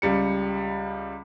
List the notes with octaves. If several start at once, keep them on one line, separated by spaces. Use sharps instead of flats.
C#2 G3 C#7